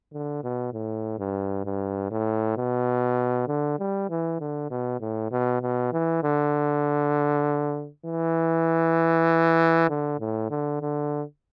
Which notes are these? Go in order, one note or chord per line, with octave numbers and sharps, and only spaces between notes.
D3
B2
A2
G2
G2
A2
B2
D3
G3
E3
D3
B2
A2
B2
B2
E3
D3
E3
D3
A2
D3
D3